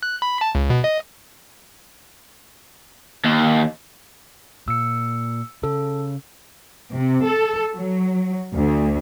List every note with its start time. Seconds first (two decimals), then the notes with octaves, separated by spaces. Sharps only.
0.03 F#6
0.22 B5
0.41 A5
0.55 C#2
0.70 B2
0.84 D#5
3.25 D#2
4.68 A#2 E6 C#7
5.63 C#3 A4
6.92 C3
7.25 A4
7.74 F#3
8.55 D2